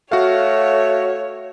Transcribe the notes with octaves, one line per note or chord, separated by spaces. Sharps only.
A3 F#4 C#5 F5